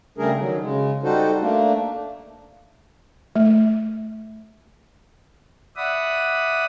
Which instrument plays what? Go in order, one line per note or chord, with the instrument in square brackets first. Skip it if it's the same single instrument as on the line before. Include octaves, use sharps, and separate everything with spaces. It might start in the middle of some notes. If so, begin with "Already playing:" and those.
[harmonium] C#3 G3 A3 D4 G#4 A#4
D#3 F#3
C#3 G#3
G3 D#4 F#4 A4 C5
A3 A#3 D4
[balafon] A3
[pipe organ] D5 E5 F#5 B5 D#6